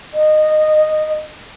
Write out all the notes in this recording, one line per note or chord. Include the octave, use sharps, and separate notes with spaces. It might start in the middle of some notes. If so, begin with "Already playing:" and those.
D#5